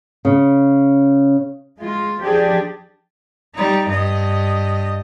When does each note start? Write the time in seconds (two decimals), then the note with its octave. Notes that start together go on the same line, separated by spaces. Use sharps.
0.25 C#3
1.78 G#3 F4
2.21 F3 D4 G4 G#4 D5
3.55 G3 D#4
3.88 G2 D#5